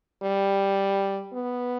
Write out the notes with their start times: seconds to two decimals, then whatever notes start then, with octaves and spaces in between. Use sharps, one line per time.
0.23 G3
1.33 B3